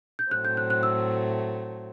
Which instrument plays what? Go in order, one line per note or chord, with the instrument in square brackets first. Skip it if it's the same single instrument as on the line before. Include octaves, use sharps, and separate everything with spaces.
[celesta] G6
[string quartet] A2 F#3 A3 C4 [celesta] F#6
[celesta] G6
F#6
F#6
E6